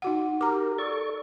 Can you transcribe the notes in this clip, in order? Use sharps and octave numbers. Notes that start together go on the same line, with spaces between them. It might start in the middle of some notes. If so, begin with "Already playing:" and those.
D#4 F#4 F#5
G4 A#4 A#5 D6
A4 D5 C#6